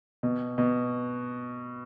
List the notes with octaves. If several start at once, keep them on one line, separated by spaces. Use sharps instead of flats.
B2
B2